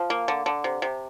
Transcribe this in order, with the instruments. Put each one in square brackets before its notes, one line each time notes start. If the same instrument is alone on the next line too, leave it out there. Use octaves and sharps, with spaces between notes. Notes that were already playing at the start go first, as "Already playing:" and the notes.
Already playing: [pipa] F3
A#3
D3
D3
C3
C3